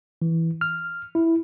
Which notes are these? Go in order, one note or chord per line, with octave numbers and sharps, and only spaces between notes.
E3
F6
E4